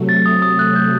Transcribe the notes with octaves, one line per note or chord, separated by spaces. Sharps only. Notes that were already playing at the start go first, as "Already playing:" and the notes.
Already playing: C3 F#3 A3
A6
D#6
C3 F#3 A3 D#6
F#6
G6